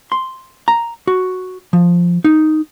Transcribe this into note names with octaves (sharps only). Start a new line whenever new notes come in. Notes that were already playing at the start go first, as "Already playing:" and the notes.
C6
A#5
F#4
F3
D#4